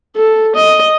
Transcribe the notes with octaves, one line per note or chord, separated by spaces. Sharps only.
A4
D#5